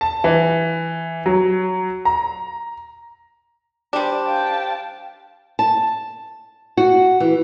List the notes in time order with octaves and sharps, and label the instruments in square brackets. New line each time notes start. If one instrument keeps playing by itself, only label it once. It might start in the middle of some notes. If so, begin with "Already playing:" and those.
[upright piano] A5
E3
F#3
A#5
[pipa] G3 D4 [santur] G4 C5
[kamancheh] F5 A5 [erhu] G5
[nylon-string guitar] A5
F#4
E3